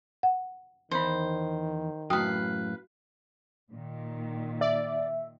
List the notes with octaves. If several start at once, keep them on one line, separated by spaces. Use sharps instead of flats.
F#5
E2 D#3 C5 B5
F#2 A2 F#4 B4 F5 G5 D#6
A#2 D#3
D5 E5